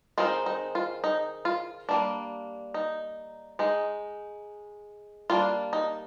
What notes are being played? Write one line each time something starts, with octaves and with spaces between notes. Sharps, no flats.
D#3 G#3 C4 D#4 F4
D#4
F4
D#4
F4
G3 A#3 D4
D#4
G#3 D#4
G3 A#3 D4 F4
D#4